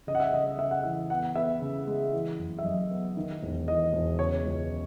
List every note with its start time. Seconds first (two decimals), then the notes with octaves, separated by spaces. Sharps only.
0.07 C#3 D#5
0.15 F#5
0.20 E5
0.33 C#3 D#5
0.46 D#5
0.58 C#3 E5
0.71 F#5
0.83 E3 E5
1.10 B3 F#5
1.35 B3 E5
1.62 C#3
1.87 G#3
2.13 E3
2.38 F#1
2.59 E5
2.64 F#2 D#5
2.91 B3
3.17 D#3
3.42 E1
3.68 E2 D#5
3.93 E1
4.18 C#3 C#5
4.44 C#2
4.70 C#3